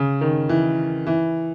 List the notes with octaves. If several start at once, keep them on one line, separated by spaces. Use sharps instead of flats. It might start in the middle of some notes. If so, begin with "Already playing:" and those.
Already playing: C#3
D#3
E3
E3